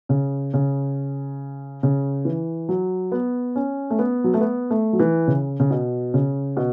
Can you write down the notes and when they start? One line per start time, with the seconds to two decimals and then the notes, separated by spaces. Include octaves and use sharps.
0.09 C#3
0.54 C#3
1.83 C#3
2.25 E3
2.69 F#3
3.12 B3
3.56 C#4
3.90 A3
3.99 B3
4.24 F#3
4.34 A3
4.41 B3
4.70 A3
4.93 F#3
5.00 E3
5.28 C#3
5.60 C#3
5.70 B2
6.14 C#3
6.57 B2